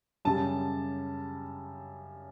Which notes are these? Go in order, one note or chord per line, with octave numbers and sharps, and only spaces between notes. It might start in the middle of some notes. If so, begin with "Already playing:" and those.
F#2 C#3 G3 A5